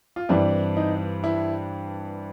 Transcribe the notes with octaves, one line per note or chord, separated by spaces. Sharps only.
F4
G2 E3 G3 C4 E4
D#4
E4